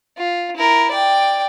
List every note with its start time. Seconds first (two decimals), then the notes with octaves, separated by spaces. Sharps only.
0.17 F4
0.56 E4 A#4
0.91 D5 G5